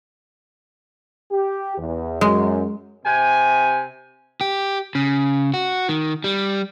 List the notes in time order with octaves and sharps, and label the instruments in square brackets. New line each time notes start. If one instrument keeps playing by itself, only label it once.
[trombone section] G4
E2
[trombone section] F#2 [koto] G#3
[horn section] C3 G#5
[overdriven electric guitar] G4
C#3
F#4
D#3
G3